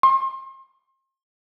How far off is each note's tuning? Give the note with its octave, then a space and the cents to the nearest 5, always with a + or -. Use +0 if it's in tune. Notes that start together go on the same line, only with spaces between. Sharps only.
C6 +35